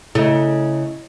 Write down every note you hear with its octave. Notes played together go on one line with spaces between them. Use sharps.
C#3 A3 E4 D#5